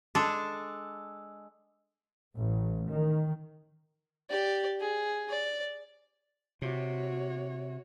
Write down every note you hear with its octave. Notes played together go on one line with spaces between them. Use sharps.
G#3 D4 A4
A1
D#3
G4 D5
G#4
D5
C3 F#4 C#5